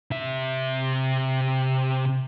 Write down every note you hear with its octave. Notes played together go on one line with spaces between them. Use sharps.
C3 E5